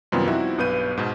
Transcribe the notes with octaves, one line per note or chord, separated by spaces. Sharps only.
F#2 C3 D#3 G3 B3 F4
F3 G3 C4 D#4 E4 F#4
B1 G2 B3 B4 G6 D#7
G#2 B2